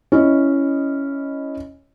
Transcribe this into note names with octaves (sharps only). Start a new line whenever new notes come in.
C#4 E4 D#5